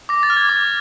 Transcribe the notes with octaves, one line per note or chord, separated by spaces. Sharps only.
D6 A#6
A6
F6
G#6
D6